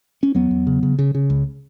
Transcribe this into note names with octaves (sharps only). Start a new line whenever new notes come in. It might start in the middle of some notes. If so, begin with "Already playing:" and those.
C#4
E2 F#3 B3
E2
C#3
C#3
C#3
C#3
C#2